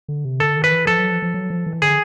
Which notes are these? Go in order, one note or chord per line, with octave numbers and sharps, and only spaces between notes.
D3
C3
D3 A4
D#3
B4
E3
F3 A4
F#3
F3
F3
F#3
F3
E3
D3 G#4